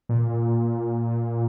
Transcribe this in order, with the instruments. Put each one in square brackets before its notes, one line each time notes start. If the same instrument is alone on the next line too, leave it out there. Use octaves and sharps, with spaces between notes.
[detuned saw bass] A#2